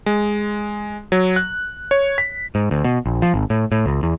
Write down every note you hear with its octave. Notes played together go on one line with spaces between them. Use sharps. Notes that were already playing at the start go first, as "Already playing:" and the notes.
G#3
F#3
F#6
C#5
B6
G#2
D2
B2
A#1
F3
G#1
A2
A2
C#2
E2